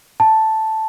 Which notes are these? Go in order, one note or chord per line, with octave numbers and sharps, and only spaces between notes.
A5